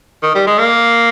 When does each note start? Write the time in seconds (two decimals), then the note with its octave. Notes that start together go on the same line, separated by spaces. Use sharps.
0.23 D#3
0.35 G3
0.47 G#3
0.58 A#3